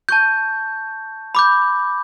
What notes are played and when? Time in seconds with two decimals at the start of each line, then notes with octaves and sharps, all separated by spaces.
0.09 A5 C#6 G6
1.35 B5 D6 G6